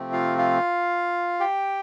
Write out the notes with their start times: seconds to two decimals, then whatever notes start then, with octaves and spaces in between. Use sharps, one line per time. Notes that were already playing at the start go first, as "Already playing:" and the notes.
Already playing: C3 F3 A3 C4
0.13 F4 F5
0.38 F4 F5
1.40 G4 G5